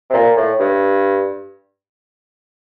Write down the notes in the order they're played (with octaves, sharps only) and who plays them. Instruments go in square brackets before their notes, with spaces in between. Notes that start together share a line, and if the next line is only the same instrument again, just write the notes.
[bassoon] C3
A#2
A2
G2